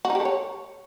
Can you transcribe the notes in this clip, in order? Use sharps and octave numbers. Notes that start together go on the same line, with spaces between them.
F#4
D#4
G4
A4
C#5